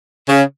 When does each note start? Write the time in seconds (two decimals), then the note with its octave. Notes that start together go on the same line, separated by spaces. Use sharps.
0.29 C#3